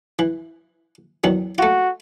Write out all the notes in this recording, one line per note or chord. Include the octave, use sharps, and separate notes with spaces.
E3
E2 D#3 F#3
A3 F4 F#4